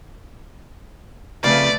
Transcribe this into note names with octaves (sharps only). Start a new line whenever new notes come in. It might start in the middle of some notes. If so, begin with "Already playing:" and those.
C#3 F3 A3 C4 B4 D5 A5